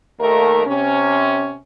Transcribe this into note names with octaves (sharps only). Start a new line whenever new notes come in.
D#2 A3 A#4
C3 C#4